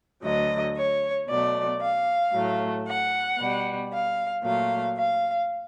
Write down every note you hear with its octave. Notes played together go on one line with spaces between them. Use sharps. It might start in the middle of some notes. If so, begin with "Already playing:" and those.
D2 D3 F#3 D#5
C#5
B2 F#3 A3 D5
F5
A2 F#3 A3
F#5
B2 G3
F5
A#2 F#3 A3 F5
F5